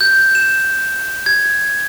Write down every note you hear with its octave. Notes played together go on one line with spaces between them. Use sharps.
G6
E7
G#6